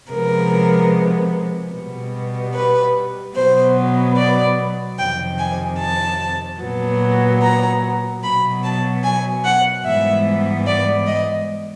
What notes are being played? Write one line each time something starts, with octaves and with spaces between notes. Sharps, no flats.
C3 F3 G#3 B3 A#4
B2 G3 B3
B4
B2 F#3 B3 C5
D5
F2 C3 D#3 G5
G#5
A5
A#2 F#3 B3
A#5
B2 F#3 B3 B5
A5
G#5
F#5
G#2 E3 G3 B3 E5
D5
D#5